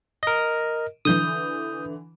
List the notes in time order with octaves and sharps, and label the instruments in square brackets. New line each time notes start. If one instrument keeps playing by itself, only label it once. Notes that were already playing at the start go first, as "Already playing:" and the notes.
[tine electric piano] A#4 D#5
[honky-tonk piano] D3 E3 [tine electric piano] D#6 G6